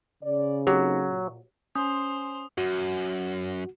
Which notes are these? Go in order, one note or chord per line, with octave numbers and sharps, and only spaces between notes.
C#3 D5
F#3 A#3 C4 D#4 G4
A#2
C#4 C5 C6 D#6
F#2 F#4